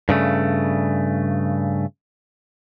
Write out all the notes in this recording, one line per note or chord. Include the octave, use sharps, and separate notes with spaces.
G2 C#3 A3